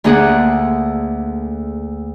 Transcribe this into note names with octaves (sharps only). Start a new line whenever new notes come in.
D2 D3 A#3 G#4 F#5